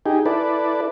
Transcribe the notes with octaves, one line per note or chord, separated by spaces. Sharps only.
D#4 G4 G#4
E4 A4 B4 D5